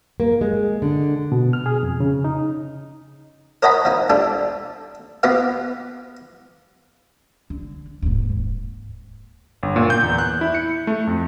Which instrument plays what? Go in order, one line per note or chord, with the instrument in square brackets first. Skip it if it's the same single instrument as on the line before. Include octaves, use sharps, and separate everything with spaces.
[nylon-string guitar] A#3
G#3
D3
[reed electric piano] B2
F6
G#4
F2
C#3
D#4
[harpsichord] A#4 C#5 D#5 F#5 A5 B5
F3 D#4
G3 D4 F4 A4
B3 F4 G4 B4 F5
[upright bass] D3
D#1 G#2
[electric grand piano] G1
A#2
G6
E2
F#6
E4
C#7
A3
F2